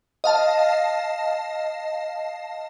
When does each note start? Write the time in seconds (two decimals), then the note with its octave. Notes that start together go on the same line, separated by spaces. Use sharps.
0.24 D#5 F5 A5